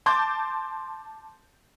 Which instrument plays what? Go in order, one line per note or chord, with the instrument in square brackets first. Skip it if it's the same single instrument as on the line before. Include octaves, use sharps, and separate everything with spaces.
[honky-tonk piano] A5 C6 D6 G6 A6